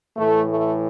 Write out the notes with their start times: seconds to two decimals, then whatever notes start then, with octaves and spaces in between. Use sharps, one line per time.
0.17 A2 E3 A3
0.46 A3